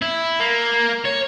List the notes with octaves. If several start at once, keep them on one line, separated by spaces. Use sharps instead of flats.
E4
A#3
C#5